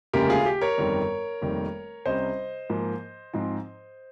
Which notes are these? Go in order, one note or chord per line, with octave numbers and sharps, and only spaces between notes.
F1 D#2 C#3 G#3 G4 A#4
F4 G#4
G4
A#4 C#5
G1 F2 D#3 G3
F1 F2 D#3 G3 A#3
C2 C3 G3 C#4 C5 D#5
G#2 F3 A#3
G#2 F3 C4 D#4